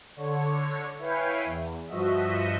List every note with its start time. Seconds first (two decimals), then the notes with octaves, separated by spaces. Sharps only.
0.16 D3 C#5
0.99 E4 B4 C#5 F5 G5 G#5
1.45 E2
1.87 G2 F3 F#4 D#5 E5